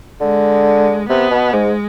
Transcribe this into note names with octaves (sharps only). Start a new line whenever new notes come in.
D3 G#3
C3 B3
B2
G#2 G#3